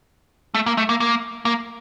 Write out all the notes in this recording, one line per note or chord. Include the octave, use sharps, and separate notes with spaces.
A3
A#3
A3
A#3
A#3
A#3